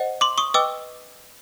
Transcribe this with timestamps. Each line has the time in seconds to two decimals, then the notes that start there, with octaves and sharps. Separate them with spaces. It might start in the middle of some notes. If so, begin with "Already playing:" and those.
Already playing: C5 D#5 F#5
0.21 C6 D6
0.38 C#6 D#6
0.54 B4 D#5 G5 D6 E6